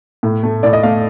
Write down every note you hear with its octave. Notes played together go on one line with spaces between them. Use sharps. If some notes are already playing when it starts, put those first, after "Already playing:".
A2
A3
A2 D5
D#5
A3 F5